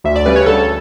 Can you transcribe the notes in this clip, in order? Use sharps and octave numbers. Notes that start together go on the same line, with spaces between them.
D2 E5
D5
C#3 G3 B4
C#5
D2 A4